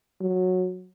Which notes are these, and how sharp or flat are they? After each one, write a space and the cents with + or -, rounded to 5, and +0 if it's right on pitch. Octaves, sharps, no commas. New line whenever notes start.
F#3 -10